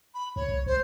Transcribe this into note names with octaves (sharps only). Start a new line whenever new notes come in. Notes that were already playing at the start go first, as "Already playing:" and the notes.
B5
D2 C#5
C2
C#2 C5